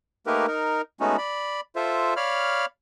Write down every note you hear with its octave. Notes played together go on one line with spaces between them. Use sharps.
A3 A#3 D#4 G4 A#4 B4
D#4 A#4
G#3 A3 B3 C#4 D#4 F#4
D5 B5
F4 A4 C5 E5
C#5 D5 F5 B5 F6